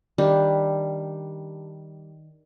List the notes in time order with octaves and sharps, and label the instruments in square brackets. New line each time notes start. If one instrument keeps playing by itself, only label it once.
[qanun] D#3 G3 D4 G4